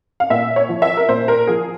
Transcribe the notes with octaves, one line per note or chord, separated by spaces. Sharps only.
F5
A#2 E5
C#5
F3
E5
A#4
A#2 C5
A#4
F3 G#4